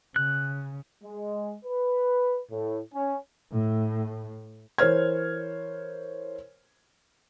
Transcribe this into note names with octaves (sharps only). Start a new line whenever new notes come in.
C#3 F#6
G#3
B4
A2
C#4
A2
E3 A#4 C5 C#5 F6 G#6